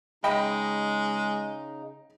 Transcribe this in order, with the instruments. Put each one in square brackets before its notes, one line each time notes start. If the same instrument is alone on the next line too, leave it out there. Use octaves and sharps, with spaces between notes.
[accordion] C#3 D#4 [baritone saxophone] G#3 [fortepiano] D#5 G5 B5